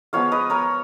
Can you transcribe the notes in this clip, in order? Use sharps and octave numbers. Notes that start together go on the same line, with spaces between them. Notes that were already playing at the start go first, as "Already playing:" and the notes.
F3 G#3 B3 F4 C#5 F5
B4 D#5
A#4 C#5